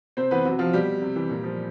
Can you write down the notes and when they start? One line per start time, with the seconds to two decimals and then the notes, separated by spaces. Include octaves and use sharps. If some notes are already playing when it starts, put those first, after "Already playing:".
0.17 C3 C4 C5
0.31 E3 B3 B4
0.45 C3 F#3 F#4
0.59 F3 F4
0.73 B2 G3 G4
1.02 C3
1.16 E3
1.30 A#2
1.44 F3